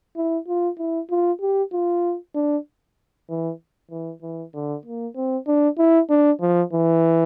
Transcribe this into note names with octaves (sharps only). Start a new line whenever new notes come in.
E4
F4
E4
F4
G4
F4
D4
E3
E3
E3
D3
A#3
C4
D4
E4
D4
F3
E3